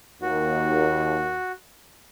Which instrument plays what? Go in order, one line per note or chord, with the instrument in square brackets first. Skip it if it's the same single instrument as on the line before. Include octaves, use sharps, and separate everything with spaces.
[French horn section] D#2 [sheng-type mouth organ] F#4